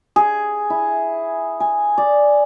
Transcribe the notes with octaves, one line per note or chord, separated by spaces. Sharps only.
G#4
E4
G#5
D5